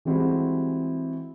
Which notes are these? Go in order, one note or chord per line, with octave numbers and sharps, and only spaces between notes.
E3 G3 G#3 C4 E4 F#4